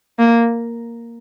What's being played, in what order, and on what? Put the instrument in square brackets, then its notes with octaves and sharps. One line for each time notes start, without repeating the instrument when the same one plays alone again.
[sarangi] A#3